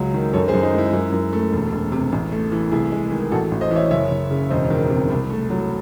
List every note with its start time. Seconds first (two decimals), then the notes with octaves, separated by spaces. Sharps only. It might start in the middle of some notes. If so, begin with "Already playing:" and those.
Already playing: C#2 F#3 G#3
0.14 D#3
0.33 F#2 A4 C#5
0.48 G#4 C5
0.53 F#2
0.63 D#4
0.73 G#3 E4
0.93 F#2 E4
1.12 F#2
1.33 A3
1.53 E1
1.72 E1
1.92 C3
2.12 A1
2.32 A3
2.52 E3
2.72 C2 E4 G#4
2.92 G#3
3.12 D#3
3.32 A1 F#4 A4
3.51 A1
3.61 C5 D#5
3.71 E3
3.76 C#5 E5
3.91 F#1 C#5 E5
4.11 F#1
4.31 C#3
4.50 E1 C5 D#5
4.70 D#3
4.90 C3
5.10 C2
5.30 A3
5.50 F#3